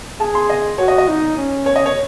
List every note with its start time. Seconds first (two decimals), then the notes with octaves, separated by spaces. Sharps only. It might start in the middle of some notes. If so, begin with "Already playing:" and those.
0.20 G#4 A5
0.35 C6
0.50 D#5
0.78 F#4 C#5
0.88 D#5
0.98 D#5
1.08 D#4
1.37 C#4
1.66 C#5
1.76 D#5
1.86 C#5